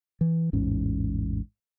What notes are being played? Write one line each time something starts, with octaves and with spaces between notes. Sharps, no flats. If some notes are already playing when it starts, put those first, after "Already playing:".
E3
A1 E2 G#2 C#4